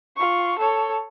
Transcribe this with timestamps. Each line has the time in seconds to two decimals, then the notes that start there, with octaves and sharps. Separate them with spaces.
0.17 F4 C#6
0.59 A4 C#5